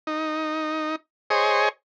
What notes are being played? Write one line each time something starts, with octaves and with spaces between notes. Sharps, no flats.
D#4
G#4 C5 C#5 D#5